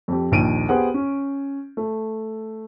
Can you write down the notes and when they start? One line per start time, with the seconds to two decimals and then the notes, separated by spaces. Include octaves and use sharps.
0.08 F2 G4
0.32 A#1 D#2 D7 D#7
0.69 B3 G4 G#4 C5 F#5
0.94 C#4
1.77 A3